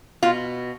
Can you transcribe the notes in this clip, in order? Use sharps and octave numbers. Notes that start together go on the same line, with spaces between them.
B2 F4